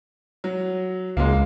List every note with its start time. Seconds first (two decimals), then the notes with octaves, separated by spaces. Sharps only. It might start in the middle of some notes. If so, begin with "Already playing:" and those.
0.44 F#3
1.17 C#2 G#3 A#3